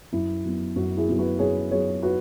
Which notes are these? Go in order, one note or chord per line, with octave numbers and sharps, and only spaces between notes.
F#2 E4
F#3 B3
F#2 F#4
E4 G#4
F#3 B3
F#4 B4
F#2 G#4 C#5
F#3 B3 G#4 C#5
F#4 B4